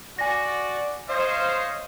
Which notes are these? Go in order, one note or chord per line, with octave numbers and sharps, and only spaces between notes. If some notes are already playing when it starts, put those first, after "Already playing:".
F#4 D5 G#5 A#6
C5 C#5 D#5 F5